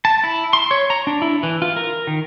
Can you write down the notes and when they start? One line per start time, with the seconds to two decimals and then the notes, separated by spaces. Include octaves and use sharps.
0.05 A5
0.24 E4
0.53 C6
0.71 C#5
0.90 A#5
1.07 D4
1.22 E4
1.43 E3
1.62 F4
1.76 A#4
2.07 D#3